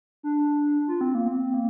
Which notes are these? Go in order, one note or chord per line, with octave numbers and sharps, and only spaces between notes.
D4
F4
C4
A#3
C4
A#3